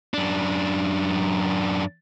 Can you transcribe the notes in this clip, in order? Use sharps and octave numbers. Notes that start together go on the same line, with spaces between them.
F#2 D4